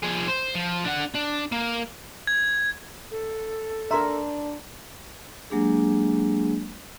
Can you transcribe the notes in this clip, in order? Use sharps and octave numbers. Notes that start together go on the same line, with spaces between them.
F3 G#4
C5
F3
D4 F#5
D4
A#3
G#6
A4
D4 A#4 E5 A#5 C6
F#3 G#3 A#3 D4 G4 G#4